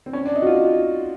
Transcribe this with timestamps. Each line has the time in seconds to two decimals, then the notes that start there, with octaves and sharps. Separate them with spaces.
0.06 C4
0.13 C#4
0.25 D4
0.35 D#4
0.42 F#4
0.47 F4